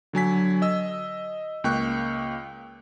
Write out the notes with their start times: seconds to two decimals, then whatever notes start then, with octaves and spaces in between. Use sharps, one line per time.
0.13 D3 F#3 G#5 B6
0.62 D#5 E6
1.64 C#2 A#3 G5 C#6 F#6